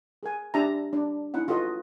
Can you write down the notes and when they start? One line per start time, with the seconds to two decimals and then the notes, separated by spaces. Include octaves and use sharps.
0.23 G#4 A#4 G#5
0.54 D4 G4 E5 A5 A#5
0.93 D4 D5
1.34 C#4 D#4 E4 F#5
1.48 F4 F#4 A4 B4 D#5